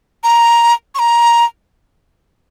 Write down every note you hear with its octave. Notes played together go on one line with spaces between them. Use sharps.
A#5
C#6
A#5